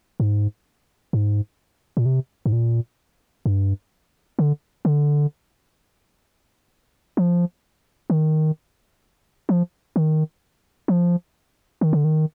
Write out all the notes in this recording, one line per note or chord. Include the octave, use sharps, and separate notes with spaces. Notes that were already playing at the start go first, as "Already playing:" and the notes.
G#2
G#2
A#2
C3
G#2
A#2
G2
D3
D3
F3
D#3
F3
D#3
F3
D#3
D3
D#3